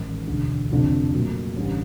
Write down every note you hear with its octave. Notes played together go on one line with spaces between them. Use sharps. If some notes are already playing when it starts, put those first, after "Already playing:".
Already playing: A1 G#2 D#3
E1 D2 D3
F1 F2 D3 F3
A#2 F#3 A3
A1 G2 D3 G3